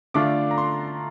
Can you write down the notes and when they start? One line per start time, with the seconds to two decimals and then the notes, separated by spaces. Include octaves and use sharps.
0.14 D3 A3 D4 F4 D6
0.51 A#5
0.58 C6